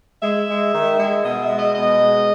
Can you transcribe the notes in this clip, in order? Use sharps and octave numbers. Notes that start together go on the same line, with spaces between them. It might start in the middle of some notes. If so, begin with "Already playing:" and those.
G#3 E5
G#3
D#3
G#3
B2 D#5
E5
G#3
D#5
B2 D#5
G#3